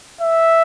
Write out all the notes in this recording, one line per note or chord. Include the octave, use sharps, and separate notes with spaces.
E5